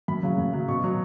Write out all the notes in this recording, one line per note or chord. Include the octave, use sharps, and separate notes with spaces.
F#2 B5
C#3 F#3
F#2
C#3 F#3
B2 C#6
F#3